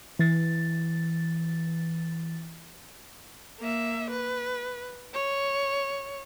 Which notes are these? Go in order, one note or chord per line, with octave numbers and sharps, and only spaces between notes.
E3 A6
A#3 E5
B4
C#5